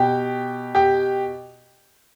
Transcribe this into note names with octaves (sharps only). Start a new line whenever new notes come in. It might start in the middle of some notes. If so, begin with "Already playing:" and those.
Already playing: B2 G4 G5
G4 G5